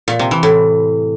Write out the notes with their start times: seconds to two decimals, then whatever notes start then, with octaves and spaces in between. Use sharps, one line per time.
0.08 A#2
0.19 C3
0.31 E3
0.43 A2